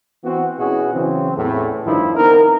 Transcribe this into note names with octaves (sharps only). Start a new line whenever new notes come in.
E3 B3 C4 F#4
B2 B3 C#4 E4 F#4 G#4
C#3 E3 F#3 C4
E2 A2
G2 D#3 F3 D4 E4
B3 C4 D#4 A#4